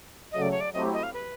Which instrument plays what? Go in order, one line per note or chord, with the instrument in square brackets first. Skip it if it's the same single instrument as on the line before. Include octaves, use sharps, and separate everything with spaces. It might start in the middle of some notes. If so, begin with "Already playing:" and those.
[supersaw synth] C#3 F#3 A3 [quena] D#5
[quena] D5
C#5
D5
[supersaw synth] F#3 A3 C4 E4 G4 [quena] D#5
[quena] D#5
F5
B4